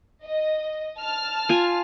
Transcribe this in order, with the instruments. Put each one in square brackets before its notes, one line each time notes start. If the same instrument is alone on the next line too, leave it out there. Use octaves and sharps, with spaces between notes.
[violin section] D#5
A5 F6
[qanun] F4 G#5